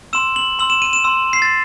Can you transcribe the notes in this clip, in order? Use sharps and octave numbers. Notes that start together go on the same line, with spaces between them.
C6 E6 E7
F#7
C6 E6 F#7
E7
D#7
E7
C6 E6
C7
A6